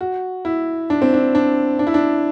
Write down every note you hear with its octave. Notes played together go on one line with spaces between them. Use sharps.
F#4
E4
D4
C4
D4
D4
D4
E4
D4